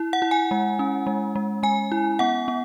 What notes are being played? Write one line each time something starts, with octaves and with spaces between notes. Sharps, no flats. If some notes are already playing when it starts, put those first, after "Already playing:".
Already playing: E4
F#5
E4
G#5
G#3
C#4
G#3
G#3
G#3 G#5
E4
B3 F#5
B3